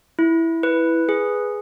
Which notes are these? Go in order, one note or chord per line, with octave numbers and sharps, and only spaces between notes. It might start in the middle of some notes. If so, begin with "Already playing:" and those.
E4
B4
G#4